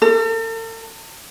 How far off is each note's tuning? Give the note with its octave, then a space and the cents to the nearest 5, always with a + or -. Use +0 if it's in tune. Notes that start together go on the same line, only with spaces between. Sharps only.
A4 +45